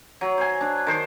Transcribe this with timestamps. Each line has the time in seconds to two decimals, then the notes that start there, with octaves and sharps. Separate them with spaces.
0.21 F#3
0.38 C5 G#5
0.61 D4
0.87 D#3 C5